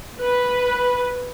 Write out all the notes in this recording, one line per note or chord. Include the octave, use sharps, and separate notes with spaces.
B4